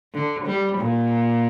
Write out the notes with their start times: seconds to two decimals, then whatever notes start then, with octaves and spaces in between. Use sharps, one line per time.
0.14 D3
0.47 G3
0.79 A#2